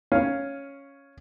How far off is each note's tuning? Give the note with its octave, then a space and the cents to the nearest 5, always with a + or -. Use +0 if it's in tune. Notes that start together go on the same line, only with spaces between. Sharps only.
C#4 +0 F5 +0